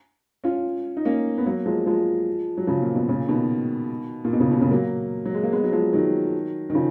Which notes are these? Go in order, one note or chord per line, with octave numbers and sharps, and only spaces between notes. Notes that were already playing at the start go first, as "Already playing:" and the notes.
C#4 F4
D#4
A#3 C#4
B3
F#3 A#3
F3 G#3
F3 G#3
F#3
C#3 F3
A#2
B2
A#2 C#3
B2 D#3
A#2
B2
A#2 C#3
B2
A#2 C#3
F#3 A#3
F#3
G#3
A#3
G#3 B3
F#3
F3 G#3
D#3 F#3
D#3
C#3 F3